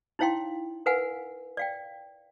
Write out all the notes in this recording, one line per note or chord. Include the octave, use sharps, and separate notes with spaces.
D#4 E4 C#5 F5 G5 C6
A#4 B4 F5 F#5 G#5
D5 F5 G5